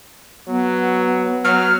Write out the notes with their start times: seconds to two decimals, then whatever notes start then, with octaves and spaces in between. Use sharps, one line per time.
0.48 F#3 B3
1.45 F#3 F6